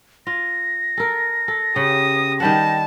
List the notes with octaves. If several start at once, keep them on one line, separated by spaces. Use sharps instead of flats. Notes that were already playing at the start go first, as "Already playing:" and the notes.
F4 A#6
A4 A#4
A4
C#3 G4 D#6
D#3 G3 F#5 A5